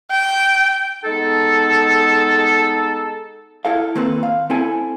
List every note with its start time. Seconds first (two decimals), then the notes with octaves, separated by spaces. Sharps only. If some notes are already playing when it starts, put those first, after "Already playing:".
0.11 G5
1.03 G#3 B3 D#4 A4
3.65 E4 A4 F5
3.95 D#3 A#3 C4 A4 B4
4.23 F5
4.50 C4 E4 A4 G#5